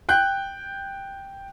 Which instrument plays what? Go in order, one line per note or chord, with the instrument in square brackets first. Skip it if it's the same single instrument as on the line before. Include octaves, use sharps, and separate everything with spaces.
[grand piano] G5 F#6 G6